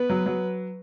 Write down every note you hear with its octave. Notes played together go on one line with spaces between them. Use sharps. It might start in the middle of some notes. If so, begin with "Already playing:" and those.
Already playing: B3 B4
F#3
F#3